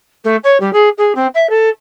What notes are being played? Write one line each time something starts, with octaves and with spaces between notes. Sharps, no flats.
A3
C#5
G3
G#4
G#4
C4
E5
A4